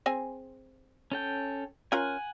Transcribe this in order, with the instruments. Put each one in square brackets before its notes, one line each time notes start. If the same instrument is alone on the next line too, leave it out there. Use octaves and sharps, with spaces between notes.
[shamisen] C4 G#4 G#5
[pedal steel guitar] C#4 A4 G5
[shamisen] C#4 F4 A#4 [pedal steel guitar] F#5 G#5